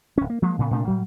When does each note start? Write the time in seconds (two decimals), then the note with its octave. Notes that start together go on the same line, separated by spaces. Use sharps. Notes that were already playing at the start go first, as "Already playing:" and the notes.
0.18 D1 C#4
0.30 A#3
0.42 F3 F#3 G#3 A#3
0.58 A2 C#3 B3
0.71 A2 C3 A3 D4
0.85 A2 F#3 G3